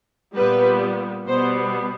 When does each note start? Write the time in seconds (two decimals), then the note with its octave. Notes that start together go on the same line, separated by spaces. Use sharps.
0.35 A#2 G3 B3 B4
1.27 B2 G3 B3 C5